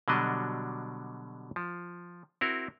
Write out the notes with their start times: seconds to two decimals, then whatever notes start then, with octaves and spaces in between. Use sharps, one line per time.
0.08 B2 D3 F#3 G3 D4 D#5
1.56 F3
2.41 C4 E4 F#4 A#4